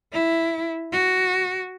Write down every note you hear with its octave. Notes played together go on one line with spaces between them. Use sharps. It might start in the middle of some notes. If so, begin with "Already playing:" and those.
E4
F#4